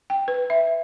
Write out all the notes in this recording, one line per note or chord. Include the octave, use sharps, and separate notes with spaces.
G5
B4
E5